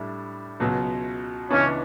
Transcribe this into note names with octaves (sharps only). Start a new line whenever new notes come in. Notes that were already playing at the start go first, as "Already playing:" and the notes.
Already playing: A2 G3 D4
C#2 B2 F#3 B3
C#2 C#3 E3 B3 C#4 D4